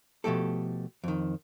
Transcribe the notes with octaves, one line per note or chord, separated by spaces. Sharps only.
B2 F3 A3 G4 A4
F2 D#3